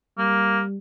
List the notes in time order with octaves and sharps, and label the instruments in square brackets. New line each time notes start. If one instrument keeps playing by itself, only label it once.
[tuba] G3 [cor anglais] A#3